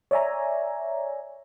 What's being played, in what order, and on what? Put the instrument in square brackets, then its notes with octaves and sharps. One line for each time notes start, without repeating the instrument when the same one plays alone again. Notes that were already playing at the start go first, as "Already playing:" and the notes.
[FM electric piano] C#5 D5 E5 G#5 A#5